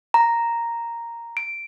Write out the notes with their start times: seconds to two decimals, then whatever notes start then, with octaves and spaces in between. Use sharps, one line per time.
0.14 A#5
1.37 D7